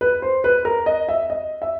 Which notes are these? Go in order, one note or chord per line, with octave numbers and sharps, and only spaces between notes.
B4
C5
B4
A#4
D#5
E5
D#5
E5